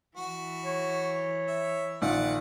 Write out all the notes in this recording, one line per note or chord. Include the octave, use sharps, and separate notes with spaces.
E3 F#4
C#5
E5
A#1 D#3 F4 D5 F#5